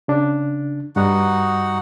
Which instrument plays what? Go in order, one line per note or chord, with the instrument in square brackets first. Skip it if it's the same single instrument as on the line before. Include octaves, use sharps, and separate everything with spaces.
[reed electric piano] C#3 D4
[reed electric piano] G2 G3 [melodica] D#4 F#4 F#5